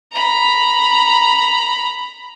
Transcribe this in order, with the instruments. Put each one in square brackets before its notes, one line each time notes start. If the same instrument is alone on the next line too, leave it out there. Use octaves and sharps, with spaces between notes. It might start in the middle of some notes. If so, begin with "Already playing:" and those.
[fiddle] A#5 B5